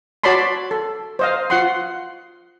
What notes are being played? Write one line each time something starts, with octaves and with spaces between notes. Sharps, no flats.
F#4 C#5 D5 A5 B5 C6
A4
C5 D#5 F5
F4 F#5 C6